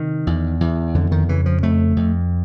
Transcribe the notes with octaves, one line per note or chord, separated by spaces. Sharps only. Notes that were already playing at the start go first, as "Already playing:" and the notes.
Already playing: C3 D#3
E2
E2
F2 D3
D#3
C#3 E3
F3
F2 A3
F2